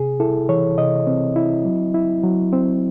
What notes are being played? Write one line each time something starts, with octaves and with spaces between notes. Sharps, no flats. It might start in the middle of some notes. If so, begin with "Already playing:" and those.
Already playing: C3 G#4
E4 A4
E3 C#5
C3 D#5
C4
E4
F#3
E4
F#3
C4